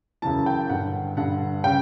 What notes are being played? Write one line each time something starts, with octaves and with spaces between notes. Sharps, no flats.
F#2 C#3 E3 A5
G5
G2 D3 F#5
G2 D3 F#5
C#3 G5